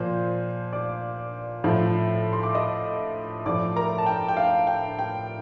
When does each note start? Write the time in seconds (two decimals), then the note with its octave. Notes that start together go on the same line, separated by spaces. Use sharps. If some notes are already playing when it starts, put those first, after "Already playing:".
Already playing: A#2 F3 C5
0.73 D5 D6
1.64 A2 F3
2.33 C6
2.43 D6
2.55 D#5 D#6
3.46 A2 F3 D5 D6
3.76 A#4 A#5
3.98 A5
4.06 G5
4.28 G5
4.37 F5
4.67 G5
4.99 G5